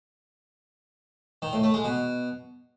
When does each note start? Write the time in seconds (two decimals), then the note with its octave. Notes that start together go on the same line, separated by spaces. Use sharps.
1.42 D#3
1.53 A2
1.63 A3
1.74 G#3
1.84 B2